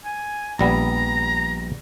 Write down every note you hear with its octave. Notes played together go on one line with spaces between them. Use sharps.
G#5
A#1 G3 B3 A#5